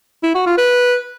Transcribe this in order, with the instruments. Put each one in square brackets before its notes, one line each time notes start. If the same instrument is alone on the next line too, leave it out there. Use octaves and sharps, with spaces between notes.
[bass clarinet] E4
F#4
F4
B4